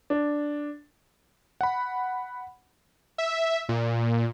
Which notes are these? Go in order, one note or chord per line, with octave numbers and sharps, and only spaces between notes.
D4
F#5 B5
E5
A#2